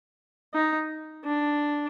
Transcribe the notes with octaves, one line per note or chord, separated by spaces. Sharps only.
D#4
D4